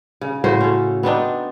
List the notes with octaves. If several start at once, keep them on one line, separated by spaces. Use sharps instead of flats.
C#3
A2 C#3 F#4 C5
C#4 A4
B3 C4 D4 D#4